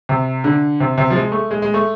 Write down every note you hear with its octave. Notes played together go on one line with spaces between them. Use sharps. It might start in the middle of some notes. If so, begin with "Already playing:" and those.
C3
D3
C3
C3
F3
G#3
A3
G#3
G#3
A3